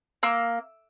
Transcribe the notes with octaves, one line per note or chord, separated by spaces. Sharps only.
A#3 E6